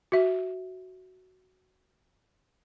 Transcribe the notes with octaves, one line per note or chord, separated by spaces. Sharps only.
F#4 E5